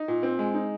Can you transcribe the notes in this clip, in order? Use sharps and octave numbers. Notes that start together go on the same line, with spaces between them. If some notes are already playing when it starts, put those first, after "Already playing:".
Already playing: D#4
A#2
C4
G#3
D#4